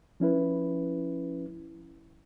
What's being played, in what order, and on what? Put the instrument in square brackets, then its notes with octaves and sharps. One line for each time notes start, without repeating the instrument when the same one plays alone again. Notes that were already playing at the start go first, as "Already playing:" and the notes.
[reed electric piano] F3 C#4 E4 B4